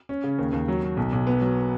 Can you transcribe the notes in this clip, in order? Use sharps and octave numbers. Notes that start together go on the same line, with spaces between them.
C#4
C#3
D#2
D#2
F#3
F#3
B1
B1
B3
F#3